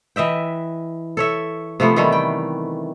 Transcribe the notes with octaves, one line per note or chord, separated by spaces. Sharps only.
E3 D#5 E5 G5
A4 C#5 E5
C3 F3 A3 B3
D#3 E3 G3 A3
G5